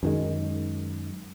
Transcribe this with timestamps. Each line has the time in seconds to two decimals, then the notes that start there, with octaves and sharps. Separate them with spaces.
0.03 F#2 D#3 G#3